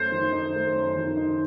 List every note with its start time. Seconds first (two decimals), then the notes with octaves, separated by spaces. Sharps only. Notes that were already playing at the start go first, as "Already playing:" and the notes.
Already playing: F#2 A3 C5
0.12 D#3
0.32 D#4
0.54 A3
0.75 F#2
0.96 D#3
1.17 D#4